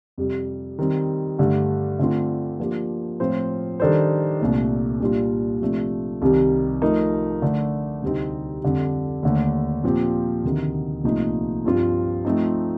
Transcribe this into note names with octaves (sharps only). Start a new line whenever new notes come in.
F2 C3 G3
D#3 G3 C4
G2 D3 A3
D3 A3 C4 F4
F3 A#3 D4 G4
A2 F3 C4 F4 C5
D#3 G3 D4 A4 C5
C2 A#2 A3 D4
A#2 G3 D4 F4
C3 F3 A3 D4
C2 C3 D#3 G3
F3 A3 D#4 A#4
D3 A3 D4
D2 C3 G3 C4 D#4
F2 D3 G3
D#2 D3 A3
A#2 F3 C4 G4
D2 C3 D#3
C2 A#2 F3 A3 D#4
G2 F3 C4 F4
F3 A3 C4 D#4